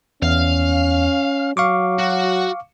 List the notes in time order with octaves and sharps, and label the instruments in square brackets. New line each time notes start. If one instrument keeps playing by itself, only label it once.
[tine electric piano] E2 [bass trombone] C#4 [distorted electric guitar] F5
[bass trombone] F#3 [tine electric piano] F5 C#6 D6
[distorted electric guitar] F#4